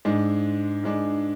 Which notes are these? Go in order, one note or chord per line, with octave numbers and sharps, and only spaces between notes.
G#2 G#3 D4
G#2 G#3 D4